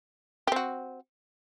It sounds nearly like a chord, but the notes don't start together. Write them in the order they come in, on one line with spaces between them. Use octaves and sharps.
G4 C4 F#4